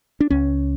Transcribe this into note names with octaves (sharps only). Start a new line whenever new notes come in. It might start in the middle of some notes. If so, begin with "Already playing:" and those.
D4
C#2 C#4